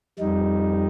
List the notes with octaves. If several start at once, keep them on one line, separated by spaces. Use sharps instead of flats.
F2 G3 D#4